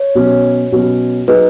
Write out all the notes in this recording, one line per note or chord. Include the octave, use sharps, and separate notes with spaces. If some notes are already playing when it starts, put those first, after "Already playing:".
Already playing: C#5
B2 F#3 C#4
B2 F#3 C#4
F#3 D#4 G#4 B4 D#5